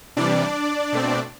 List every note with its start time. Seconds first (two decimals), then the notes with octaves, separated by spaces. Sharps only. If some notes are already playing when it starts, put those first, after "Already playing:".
0.17 C3 E3 G3 D4 D5
0.92 B2 A3 C4